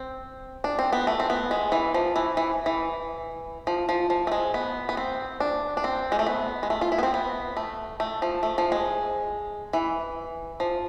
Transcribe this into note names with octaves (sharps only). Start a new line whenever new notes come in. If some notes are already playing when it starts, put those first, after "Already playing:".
Already playing: C4
D4
C4
B3
A3
C4
B3
G#3
E3
F3
E3
E3
E3
F3
F3
F3
A3
G#3
B3
B3
C4
D4
D4
C4
G#3
A3
B3
G#3
A3
F4
E4
B3
C4
B3
A3
A3
F3
A3
F3
G#3
E3
F3